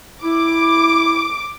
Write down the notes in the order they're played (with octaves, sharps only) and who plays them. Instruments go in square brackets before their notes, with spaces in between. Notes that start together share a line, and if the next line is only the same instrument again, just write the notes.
[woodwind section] E4 [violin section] D6